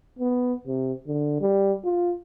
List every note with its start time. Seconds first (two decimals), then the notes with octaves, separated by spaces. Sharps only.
0.19 B3
0.67 C3
1.07 D3
1.40 G3
1.84 F4